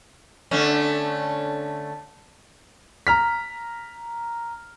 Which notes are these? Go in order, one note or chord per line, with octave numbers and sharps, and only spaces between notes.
D3 A3 C#4
A#5 F6 B6